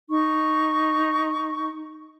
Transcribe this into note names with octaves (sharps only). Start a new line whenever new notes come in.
D#4 C#6